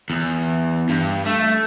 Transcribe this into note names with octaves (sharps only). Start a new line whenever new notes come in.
E2
G2
A3